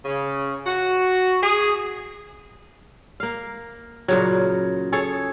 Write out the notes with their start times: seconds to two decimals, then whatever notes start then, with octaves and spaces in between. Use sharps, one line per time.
0.05 C#3
0.65 F#4
1.42 G#4
3.20 A#3 F5
4.08 A#2 C#3 F#3
4.92 G#4 A4 C#5